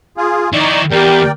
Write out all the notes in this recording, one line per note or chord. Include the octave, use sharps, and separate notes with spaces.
F4 G#4
D#3 D#4 E4 D5 C#6
E2 G4 A#4 D5 G5